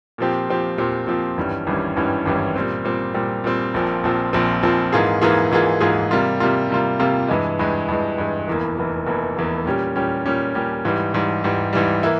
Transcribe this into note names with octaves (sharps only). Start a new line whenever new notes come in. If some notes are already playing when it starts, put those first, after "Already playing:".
A#2 F3 C4 G4
A#2 F3 C4 G4
A#2 F3 C4 G4
A#2 F3 C4 G4
G#1 G2 E3 G3 C#4
G#1 G2 E3 G3 C#4
G#1 G2 E3 G3 C#4
G#1 G2 E3 G3 C#4
A#2 G3 C4
A#2 G3 C4
A#2 G3 C4
A#2 G3 C4
A#1 A#2 F3 C4
A#1 A#2 F3 C4
A#1 A#2 F3 C4
A#1 A#2 F3 C4
G#2 E3 A#3 F4 G#4
G#2 E3 A#3 F4 G#4
G#2 E3 A#3 F4 G#4
G#2 E3 A#3 F4 G#4
C3 G3 A#3 F4
C3 G3 A#3 F4
C3 G3 A#3 F4
C3 G3 A#3 F4
G2 E3 G#3
G2 E3 G#3
G2 E3 G#3
G2 E3 G#3
F1 E2 E3 A#3
F1 E2 E3 A#3
F1 E2 E3 A#3
F1 E2 E3 A#3
A#2 G3 C#4 G4
A#2 G3 C#4 G4
A#2 G3 C#4 G4
A#2 G3 C#4 G4
G#2 E3 G3
G#2 E3 G3
G#2 E3 G3
G#2 E3 G3
E3 A#3 E4